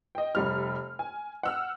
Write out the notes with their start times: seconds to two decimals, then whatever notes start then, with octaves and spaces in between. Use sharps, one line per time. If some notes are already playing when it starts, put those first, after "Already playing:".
0.15 D#5 G5
0.35 F1 G3 F6
0.99 G#5
1.43 F#5 E6 F6